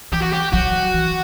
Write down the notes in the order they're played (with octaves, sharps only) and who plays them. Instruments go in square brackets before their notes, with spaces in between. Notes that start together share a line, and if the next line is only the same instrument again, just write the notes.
[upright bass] E3 [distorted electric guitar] G4
[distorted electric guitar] F#4
G4
[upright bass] F#3 [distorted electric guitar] F#4
[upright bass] E3